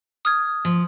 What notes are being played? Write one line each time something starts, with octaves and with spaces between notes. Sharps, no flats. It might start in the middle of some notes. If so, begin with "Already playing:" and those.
D#6 F6 G#6
F3